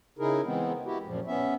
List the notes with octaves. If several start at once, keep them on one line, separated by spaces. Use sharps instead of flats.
C#3 D#4 E4 G#4 A#4
E3 G#3 B3 C4
E4 F#4 G4
F#2 A#2 F3
B3 C#4 E5